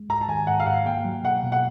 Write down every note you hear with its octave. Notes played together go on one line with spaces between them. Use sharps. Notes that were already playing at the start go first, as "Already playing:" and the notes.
Already playing: G#3
G#2 A#5
A5
D#3 G#5
G#2 F#5
F5
G#2 F#5
A#3 G5
F#3
B2 F#5
B2
F#5